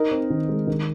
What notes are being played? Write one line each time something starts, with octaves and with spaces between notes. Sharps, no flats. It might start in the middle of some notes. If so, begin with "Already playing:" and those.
Already playing: D#4 A#4
C4
D#3
G#3
D#3